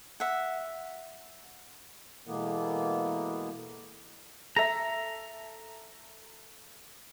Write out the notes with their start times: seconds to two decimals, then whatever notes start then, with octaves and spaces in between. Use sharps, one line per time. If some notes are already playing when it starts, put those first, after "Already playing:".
0.20 E5 F#5
2.27 B2 E3 G#3 A#3 B3 A4
4.57 A4 E5 A#5